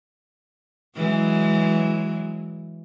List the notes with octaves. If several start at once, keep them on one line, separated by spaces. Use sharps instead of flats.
E3 F#3 G#3